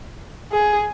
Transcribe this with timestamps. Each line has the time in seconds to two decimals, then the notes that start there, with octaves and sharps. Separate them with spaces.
0.52 G#4